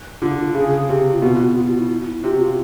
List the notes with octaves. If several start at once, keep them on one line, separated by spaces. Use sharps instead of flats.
D3 F4
F4
C#3 G#4
C3
F4
B2 F#4
F4
F4
F4
F#4
E4
E4
C3 F4
F#4
F4